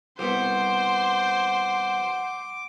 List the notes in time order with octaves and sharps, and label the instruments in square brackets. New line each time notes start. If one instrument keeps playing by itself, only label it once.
[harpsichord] C2 B2 [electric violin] C5 [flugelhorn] F#5 [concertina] D6